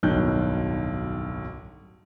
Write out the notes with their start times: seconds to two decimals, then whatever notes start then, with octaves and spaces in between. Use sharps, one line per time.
0.03 D1 B1 G2 D#3 F#6 G6